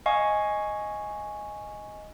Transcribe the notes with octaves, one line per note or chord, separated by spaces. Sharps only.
D#5 F5 G#5 C#6